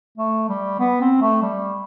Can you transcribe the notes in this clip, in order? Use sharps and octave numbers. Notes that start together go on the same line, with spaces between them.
A3
G3
B3
C4
A3
G3